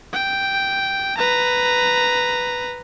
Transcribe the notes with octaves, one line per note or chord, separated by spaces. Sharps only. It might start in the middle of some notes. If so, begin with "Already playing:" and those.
G5
B4 A#5